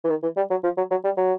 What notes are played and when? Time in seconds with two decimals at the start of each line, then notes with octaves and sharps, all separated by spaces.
0.04 E3
0.10 D#3
0.23 E3
0.37 G3
0.50 F#3
0.64 F3
0.77 F#3
0.91 F#3
1.04 G3
1.17 F#3